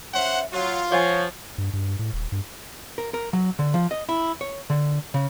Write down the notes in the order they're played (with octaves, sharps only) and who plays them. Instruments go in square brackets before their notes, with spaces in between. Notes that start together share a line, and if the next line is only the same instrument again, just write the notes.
[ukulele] C#4 E5 [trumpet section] C5 F#5
[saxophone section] F#3 [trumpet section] F4 [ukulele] C5
[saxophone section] F3 [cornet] C#5 [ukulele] F5 F#5 G#5
[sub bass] G2
G2
A2
D#1
G2
[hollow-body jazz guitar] A#4
A#4
F#3
D3
F3
D#5
E4
C#5
D3
C#3